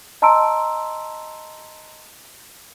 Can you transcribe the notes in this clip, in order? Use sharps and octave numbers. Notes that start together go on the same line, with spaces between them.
D#5 A5 A#5 C6 E6 D7